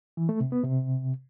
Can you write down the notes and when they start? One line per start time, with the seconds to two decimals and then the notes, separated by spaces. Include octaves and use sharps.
0.17 E3
0.29 A3
0.40 C3
0.52 B3
0.64 C3